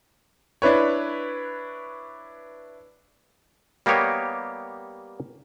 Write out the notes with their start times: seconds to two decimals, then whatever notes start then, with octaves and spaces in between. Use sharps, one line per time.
0.62 D4 E4 B4 C#5
3.86 G3 A#3 B3 G4 C#5 D#5